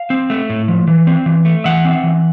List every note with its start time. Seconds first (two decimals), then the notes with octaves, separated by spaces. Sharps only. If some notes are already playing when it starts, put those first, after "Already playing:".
Already playing: F5
0.10 C4
0.30 A3
0.50 A2
0.68 F3
0.88 E3
1.07 C4
1.26 E3
1.45 A3
1.64 E3 E5 F#5
1.85 C4
2.03 E3